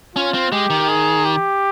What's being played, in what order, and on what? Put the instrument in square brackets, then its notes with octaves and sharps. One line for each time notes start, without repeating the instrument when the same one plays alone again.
[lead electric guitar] C#4 [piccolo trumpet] F4
[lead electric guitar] C4
[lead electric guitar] G#3 [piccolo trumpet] G4
[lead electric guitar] D#3
[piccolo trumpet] G#4
G4